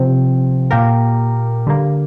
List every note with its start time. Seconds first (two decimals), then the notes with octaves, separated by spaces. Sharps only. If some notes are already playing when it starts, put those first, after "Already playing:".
Already playing: C3 F3 C4
0.71 A#2 A#3 G4 A#4
1.67 D3 G3 A#3